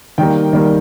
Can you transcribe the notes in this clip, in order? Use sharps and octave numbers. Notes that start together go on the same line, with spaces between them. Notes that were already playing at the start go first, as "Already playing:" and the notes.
D#3 G3 A#3 G5
D#3 G3 A#3